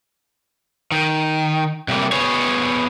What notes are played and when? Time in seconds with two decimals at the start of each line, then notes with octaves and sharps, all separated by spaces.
0.92 D#3
1.88 C3 G3 A3 A#3
2.12 B3 G#4 C#5